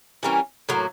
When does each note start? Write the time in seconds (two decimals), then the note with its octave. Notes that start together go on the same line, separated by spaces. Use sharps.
0.23 E3 G3 A#3 C#4
0.69 A2 F#3 A#3